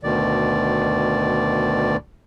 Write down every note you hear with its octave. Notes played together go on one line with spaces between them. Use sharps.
D2 B2 D#3 D5